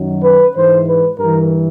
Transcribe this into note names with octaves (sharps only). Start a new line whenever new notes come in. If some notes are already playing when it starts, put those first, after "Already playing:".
Already playing: F#2 D#3 F#3
B4
G#2 E3 C5
B4
G2 A#4
E3